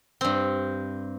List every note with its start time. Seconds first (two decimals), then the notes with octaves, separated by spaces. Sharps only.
0.21 G2 C4